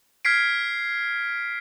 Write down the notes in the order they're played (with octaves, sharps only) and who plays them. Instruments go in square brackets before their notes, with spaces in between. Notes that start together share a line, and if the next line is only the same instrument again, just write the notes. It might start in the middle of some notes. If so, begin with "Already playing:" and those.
[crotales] F6 G#6 B6 C7 D7